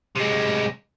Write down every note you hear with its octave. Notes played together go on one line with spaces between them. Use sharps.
C3 G#3